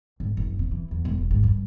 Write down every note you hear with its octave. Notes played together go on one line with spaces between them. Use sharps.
G#1
F#1
C3
E3
E2
E1
D#1
G#1
G2